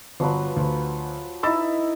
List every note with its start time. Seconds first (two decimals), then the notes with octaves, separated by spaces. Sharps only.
0.20 G1 F3 F#3 B4
0.56 D2
1.43 D#4 E4 B5 E6 A6